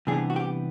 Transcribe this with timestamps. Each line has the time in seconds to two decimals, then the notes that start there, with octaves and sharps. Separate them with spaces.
0.07 C3 E3 G3 B3 D4 G#4
0.30 F#4
0.36 G4